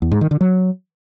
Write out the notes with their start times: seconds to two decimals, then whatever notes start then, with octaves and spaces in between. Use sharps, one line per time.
0.02 E2
0.12 G#2
0.21 D#3
0.31 D3
0.41 F#3